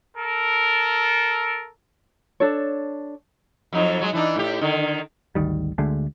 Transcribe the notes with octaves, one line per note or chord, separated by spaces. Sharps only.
A4 A#4
D4 A4 C#5
F2 F#3 D#4
F#3 G#3
E3 D4 D#4
A2 G4
D3 D#3
G#1 D2 D#3 G3
D2 D3 G#3 A3